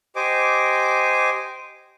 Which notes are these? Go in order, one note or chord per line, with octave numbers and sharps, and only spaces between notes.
G4 C5 D#5 G#5 D6